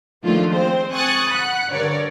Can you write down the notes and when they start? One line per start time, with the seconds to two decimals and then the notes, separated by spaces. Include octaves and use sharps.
0.23 D#3 F3 A3 A#3 D4 F4
0.53 G#3 C4 C5
0.94 G#5 C#6 D#6 F#6 A6
1.28 F#5 B5 F#6
1.71 G2 D3 A#4 C#5 D5